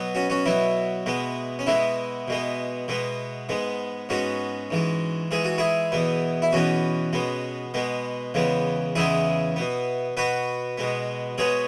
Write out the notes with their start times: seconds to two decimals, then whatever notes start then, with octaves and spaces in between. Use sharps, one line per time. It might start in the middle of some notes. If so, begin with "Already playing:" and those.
Already playing: B2 F#3 B3
0.15 C#4 F#4
0.30 C#4 F#4
0.46 B2 F#3 B3 E4
1.06 B2 G#3 B3
1.59 C#4
1.67 B2 G#3 B3 E4
2.28 B2 G#3 B3
2.88 B2 G#3 B3
3.49 G#2 G#3 B3
4.09 G#2 G#3 B3 C#4 F#4
4.70 G#2 E3 G#3
5.31 G#2 E3 G#3 G#4
5.45 F#4
5.58 E4 G#4
5.92 E2 B2 B3
6.42 E4
6.52 E2 B2 B3 C#4 F#4
7.13 B2 G#3 B3
7.74 B2 G#3 B3
8.34 E2 C#3 G#3 B3
8.95 E2 C#3 G#3 B3 E4 G#4
9.56 B2 B3
10.17 B2 B3 F#4 B4
10.78 B2 G#3 B3
11.38 B2 G#3 B3 G#4 C#5